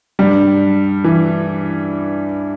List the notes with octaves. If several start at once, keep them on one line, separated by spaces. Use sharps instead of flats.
G2 G3
E3